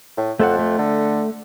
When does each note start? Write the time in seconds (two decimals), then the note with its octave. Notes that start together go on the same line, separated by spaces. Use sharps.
0.18 A2
0.40 F2 A3 A4 F#5
0.59 A3
0.79 D3